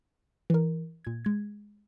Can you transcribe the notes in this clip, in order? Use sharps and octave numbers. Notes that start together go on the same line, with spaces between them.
E3 A#4
A#2 G#6
G#3 G#6